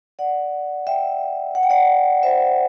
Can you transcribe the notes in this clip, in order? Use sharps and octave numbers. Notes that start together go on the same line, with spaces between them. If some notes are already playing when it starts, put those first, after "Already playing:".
D5 F#5
E5 G5
F#5
G5
D5 F#5
C5 E5